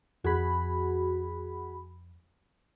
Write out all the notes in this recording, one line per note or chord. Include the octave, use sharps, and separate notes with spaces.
F2 F#4 G#4 B5